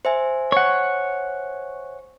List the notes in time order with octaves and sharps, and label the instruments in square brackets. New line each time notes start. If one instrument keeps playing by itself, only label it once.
[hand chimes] C5 E5 G#5
[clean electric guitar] C#5 F#5